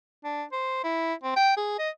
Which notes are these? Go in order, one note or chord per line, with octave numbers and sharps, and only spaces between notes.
D4
C5
E4
C4
G5
G#4
D#5